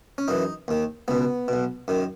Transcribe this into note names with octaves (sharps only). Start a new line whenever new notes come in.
C#4
F#2 E3 D#4
D#2 D#3
C#2 B2 B3
B1 B2
F#2 D#3